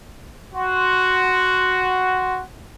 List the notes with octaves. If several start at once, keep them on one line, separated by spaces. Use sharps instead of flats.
F#4 C6